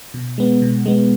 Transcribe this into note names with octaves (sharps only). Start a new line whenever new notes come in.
B2
G#3 B3
B2
G#3 B3